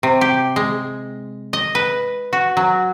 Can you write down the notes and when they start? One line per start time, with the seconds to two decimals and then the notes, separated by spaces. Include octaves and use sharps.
0.03 C3
0.21 G4
0.56 G#3
1.53 D#5
1.75 B4
2.33 F#4
2.57 F#3